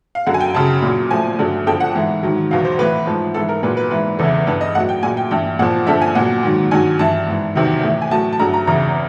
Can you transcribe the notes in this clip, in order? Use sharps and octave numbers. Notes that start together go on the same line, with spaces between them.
F5
F#2 D3 F#3 F#5
G#5
G5
F#2 C#3 F#3 A5
A#2 F#3
A2 F3 G#5
G2 D3 F#3
F2 D3 F3 G5
F#5
G#2 E3
G#2 D#3 F#3
E2 B2 F#3 F5
C5
A2 E3 B4
G#2 F3
G#2 E3 A4
A#4
A#2 F#3 B4
B4
G#2 E3 B4
E2 C#3 E3 A4
G2 E3 B4
D#5
A2 F#3 F#5
G5
A#2 F#3 G#5
G5
G2 E3 G5
A#2 F3 F#5
G2 D3 F3 E5
G#5
A#2 F#3 F#5
G#2 D#3 F#3
G2 D#3 F#3 G#5
G2 E3 A5
G#2 E3
E2 C3 D#3 F#3
A2 E3
G#5
A2 F#3 A5
A5
G2 D3 F#3 A#5
A#5
E2 C#3 E3 A#5